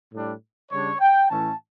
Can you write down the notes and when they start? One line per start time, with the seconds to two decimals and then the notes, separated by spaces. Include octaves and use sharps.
0.13 A2 G3 D4
0.71 C#3 G3 D4 C#5
1.01 G5
1.30 A2 E3 A3 C#4 A5